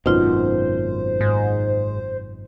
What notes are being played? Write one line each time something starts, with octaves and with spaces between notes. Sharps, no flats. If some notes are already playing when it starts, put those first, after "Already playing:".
G#1 F#2 B2 D#4 F4 C5
G#2